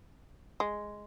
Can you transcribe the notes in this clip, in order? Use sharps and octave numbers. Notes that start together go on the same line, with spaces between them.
G#3